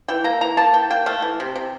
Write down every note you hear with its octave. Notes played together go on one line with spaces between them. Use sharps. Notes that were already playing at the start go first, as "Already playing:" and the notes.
E3 G5
A#3 A#5
E3 A#5
A#3 A5
E3 G5
A#3 G5
A3 F5
E3
C3
C3